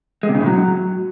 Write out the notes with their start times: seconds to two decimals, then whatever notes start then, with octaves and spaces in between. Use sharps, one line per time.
0.23 G#3
0.29 C3
0.35 C#3
0.40 A2
0.46 F#3